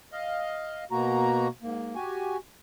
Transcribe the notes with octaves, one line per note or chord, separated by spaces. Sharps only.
D#5 F5
B2 A#3 F#4 A#5
G#2 A#3
F#4 G4 G#5